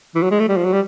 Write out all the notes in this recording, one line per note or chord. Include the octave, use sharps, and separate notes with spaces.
E3
F#3
G#3
A3
G3
F3
F#3
G3